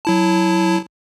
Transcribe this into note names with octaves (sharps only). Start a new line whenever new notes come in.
F#3 E4 A5